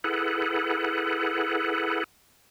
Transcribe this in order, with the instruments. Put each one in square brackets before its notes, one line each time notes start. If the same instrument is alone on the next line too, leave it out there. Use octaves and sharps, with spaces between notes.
[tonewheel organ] E4 G#4 A4 B4 F#5